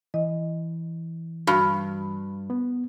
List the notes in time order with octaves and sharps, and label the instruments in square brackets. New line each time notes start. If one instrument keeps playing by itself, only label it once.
[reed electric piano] E3 [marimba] D#5
[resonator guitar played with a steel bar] G2 [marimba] F#4
[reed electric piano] B3